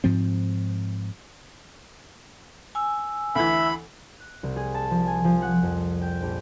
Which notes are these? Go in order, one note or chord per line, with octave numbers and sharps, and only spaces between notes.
G#2 F3 C4
G#5 E6
D2 E3 E5 B5
F#6
C2
G#4
A5
F3
G#5
F3
F#5
F2
G5
A#1